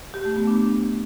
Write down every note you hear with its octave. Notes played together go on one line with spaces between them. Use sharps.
G4
A3
B3
D4